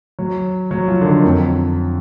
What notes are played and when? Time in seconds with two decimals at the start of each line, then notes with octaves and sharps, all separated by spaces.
0.19 F#3
0.71 F#3
0.88 F3
1.01 D3
1.06 D#3
1.24 F2